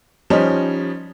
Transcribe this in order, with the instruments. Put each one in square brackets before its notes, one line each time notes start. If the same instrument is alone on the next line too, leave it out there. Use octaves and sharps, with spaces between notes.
[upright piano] F3 G3 C#4 D#4